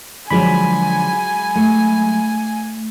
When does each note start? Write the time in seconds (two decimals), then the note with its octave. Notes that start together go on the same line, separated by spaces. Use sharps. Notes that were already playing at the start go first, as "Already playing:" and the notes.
0.30 D3 F3 F#3 G#3 G#5 B5
1.56 A3